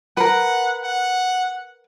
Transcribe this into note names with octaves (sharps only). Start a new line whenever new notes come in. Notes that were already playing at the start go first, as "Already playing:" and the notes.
A#4 B4 F#5
F#5